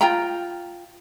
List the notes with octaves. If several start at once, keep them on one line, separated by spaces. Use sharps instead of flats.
F4 G5 A#5